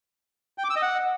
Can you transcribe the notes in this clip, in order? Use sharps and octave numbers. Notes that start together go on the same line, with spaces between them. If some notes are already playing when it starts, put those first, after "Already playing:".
G5
D6
E6
D#5
F#5